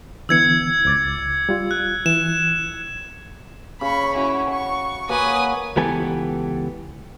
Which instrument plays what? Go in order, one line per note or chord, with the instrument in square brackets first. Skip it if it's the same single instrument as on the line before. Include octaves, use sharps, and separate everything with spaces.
[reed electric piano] D3 E3 B3 [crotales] E6 G#6 C#7
[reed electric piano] C#2 D6 A6
G3 F4
[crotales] F#6
[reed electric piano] E3 [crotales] E7
[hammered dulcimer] C#3 [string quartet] B5 C#6
[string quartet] C#4 E4 [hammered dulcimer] F#4
[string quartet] C#6
[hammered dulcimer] A#3 F#4 C#5 [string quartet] B4 G#5 D#6
[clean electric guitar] C#2 E3 B3 G4 A4 G#5